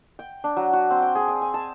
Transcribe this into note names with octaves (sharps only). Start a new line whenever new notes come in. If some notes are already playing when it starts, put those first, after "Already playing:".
G5
D4
F#3
F#4
C4
G5
G#4
D#6
G#5
A5